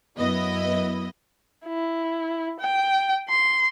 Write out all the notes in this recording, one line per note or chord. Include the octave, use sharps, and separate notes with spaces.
F#2 B3 E4 D#5
E4
G5
C6